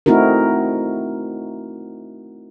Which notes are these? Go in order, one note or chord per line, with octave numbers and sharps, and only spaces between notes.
A3 C4 D#4 E4 F#4 A#4